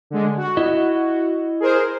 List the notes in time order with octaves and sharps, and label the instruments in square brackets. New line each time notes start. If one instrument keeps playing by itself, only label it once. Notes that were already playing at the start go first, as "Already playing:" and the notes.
[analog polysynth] D3 G#3
F#4
[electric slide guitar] E4 D#5
[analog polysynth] G#4 A#4 C5